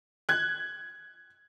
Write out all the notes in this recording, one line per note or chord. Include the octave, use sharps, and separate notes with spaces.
F#6 G#6